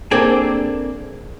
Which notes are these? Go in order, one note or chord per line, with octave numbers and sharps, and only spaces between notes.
A#3 C4 D4 G#4 A4